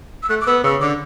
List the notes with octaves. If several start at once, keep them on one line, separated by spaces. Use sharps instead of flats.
E6
A3 F#6
D6
B3 E6
C#3 E6
D3 D6